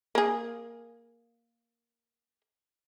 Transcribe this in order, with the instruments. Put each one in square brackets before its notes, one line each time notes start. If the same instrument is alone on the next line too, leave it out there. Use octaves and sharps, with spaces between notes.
[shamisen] A#3 G#4